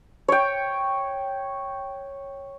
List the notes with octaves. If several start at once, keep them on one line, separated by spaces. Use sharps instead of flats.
C#5 G5